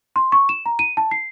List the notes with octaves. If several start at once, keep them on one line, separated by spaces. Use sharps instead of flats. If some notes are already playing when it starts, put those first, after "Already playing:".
C6
C#6
E7
A#5
D#7
A5
C7